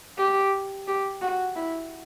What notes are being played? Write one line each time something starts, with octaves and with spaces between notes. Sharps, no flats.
G4
G4
F#4
E4